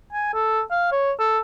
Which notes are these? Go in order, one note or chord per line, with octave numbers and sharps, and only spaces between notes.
G#5
A4
F5
C#5
A4